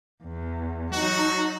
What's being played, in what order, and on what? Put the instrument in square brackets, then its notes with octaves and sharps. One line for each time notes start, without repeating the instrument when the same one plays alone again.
[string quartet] E2
[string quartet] F#3 D#4 A5 [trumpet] F#4